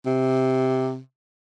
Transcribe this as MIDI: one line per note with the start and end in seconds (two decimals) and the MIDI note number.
0.06 0.99 48